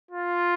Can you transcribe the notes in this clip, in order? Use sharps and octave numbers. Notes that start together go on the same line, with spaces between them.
F4